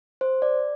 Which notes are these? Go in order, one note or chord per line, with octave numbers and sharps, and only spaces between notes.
C5
D5